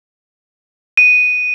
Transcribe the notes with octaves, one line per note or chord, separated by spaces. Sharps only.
D#7